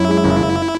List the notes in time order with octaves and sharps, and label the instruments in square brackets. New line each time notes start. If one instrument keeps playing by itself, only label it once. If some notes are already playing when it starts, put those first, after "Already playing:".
Already playing: [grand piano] F#2 [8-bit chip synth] E4
[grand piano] G#3
F#1
F#1